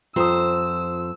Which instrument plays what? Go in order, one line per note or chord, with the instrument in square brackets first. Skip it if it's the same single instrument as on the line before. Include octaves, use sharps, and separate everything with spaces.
[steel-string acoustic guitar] F2 C5 A#5 [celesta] F4 D#6 [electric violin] E6